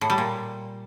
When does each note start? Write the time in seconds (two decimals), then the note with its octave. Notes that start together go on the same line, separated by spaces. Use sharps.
0.01 A2
0.10 G3
0.18 A#2